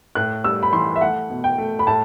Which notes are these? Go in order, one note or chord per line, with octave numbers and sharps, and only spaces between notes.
A2 F#6
G3 E6
B5
E3 C6
E5
A3 F#5
B2
G5
A3
B5
A2 A5